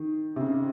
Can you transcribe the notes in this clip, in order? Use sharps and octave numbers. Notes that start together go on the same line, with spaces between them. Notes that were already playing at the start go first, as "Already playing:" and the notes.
Already playing: D#3
C3
C#3